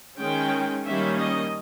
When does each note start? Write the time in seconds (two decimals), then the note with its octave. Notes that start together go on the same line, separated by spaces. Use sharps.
0.18 D#3 G#3 C#4 G5
0.84 D#3 G3 A#3 C#4 E5
1.18 D#5